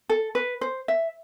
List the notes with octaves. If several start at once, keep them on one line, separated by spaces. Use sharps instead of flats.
A4
B4
C5
E5